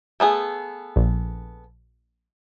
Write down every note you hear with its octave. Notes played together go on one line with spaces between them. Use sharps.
A3 B3 G#4
A#1